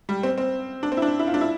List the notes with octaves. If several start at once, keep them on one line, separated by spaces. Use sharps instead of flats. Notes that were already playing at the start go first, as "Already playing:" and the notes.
G3
C4
C4
D4
C4
E4
D4
E4
F4
D4
E4